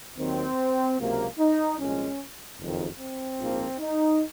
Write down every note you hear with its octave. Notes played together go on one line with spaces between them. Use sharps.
D#2 D#3 F#3 C4
C#2 C3 F#3 A#3
D#4
C2 A#2 F3 G#3 C#4
F#1 F2 D#3
C4
A#1 G#2 F3 A#3
D#4